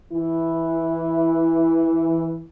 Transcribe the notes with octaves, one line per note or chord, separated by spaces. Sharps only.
E3 E4